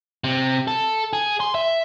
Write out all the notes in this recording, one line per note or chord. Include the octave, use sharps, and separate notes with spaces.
C3
A4
G#4
C6
E5